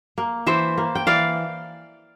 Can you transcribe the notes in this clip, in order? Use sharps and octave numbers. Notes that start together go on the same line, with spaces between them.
A#3
E3 C5 E5
A#3
G5
E3 D5 F5